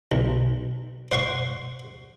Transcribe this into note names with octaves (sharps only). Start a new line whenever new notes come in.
B1
C5 F#5 C6 C#6